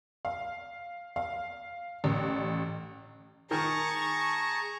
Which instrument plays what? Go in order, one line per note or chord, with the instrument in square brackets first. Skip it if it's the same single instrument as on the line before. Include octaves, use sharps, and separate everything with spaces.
[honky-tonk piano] F5
F5
A1
[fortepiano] D#3 [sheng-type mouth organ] G#4 A5 A#5 [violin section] C#6